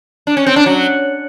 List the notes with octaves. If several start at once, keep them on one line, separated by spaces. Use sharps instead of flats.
D4
C#4
C4
D4
F#3